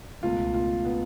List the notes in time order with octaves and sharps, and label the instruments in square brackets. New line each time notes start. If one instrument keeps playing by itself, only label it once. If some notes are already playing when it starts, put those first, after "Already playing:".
[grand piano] C#2 B2 A3 [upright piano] F4
[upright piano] F4
B3